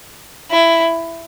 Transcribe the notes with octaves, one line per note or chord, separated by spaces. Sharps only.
E4